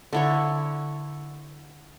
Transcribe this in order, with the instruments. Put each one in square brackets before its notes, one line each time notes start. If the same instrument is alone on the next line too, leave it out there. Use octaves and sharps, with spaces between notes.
[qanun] D3 E4 C#5